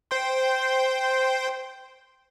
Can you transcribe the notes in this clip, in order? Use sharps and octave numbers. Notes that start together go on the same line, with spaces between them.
C5 G5 C6